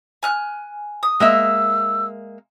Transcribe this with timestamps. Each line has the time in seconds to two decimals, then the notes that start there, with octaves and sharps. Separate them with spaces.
0.23 G#5 F6 F#6
1.03 D#6
1.20 G#3 A#3 E5 E6